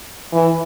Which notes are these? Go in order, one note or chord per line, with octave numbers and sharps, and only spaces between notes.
E3